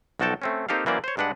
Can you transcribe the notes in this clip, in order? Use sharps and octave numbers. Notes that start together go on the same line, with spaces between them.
B1 F3 F#4 A4 G5 A5
A3 C4 C#4
A#3 C4 D#4 G4 A4 F5
E3 F#3 A#3 C#4 C5 D5
C5 C#5
G2 G#3 D4 B4 F#5